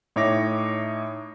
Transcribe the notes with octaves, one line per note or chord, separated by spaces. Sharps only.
A2 D#4 C#5 E5 D6 A#6